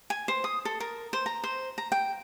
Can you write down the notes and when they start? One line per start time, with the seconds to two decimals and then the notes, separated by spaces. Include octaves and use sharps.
0.10 G#5
0.28 C5
0.44 D#6
0.65 A4
0.80 A#4
1.13 C5
1.26 A#5
1.44 C5
1.78 A#5
1.92 G5